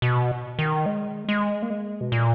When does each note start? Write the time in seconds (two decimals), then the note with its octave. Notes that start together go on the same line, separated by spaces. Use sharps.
0.02 B2
0.59 D#3
0.86 G#3
1.29 G#3
1.62 A#3
1.70 G#3
2.01 B2
2.12 A#2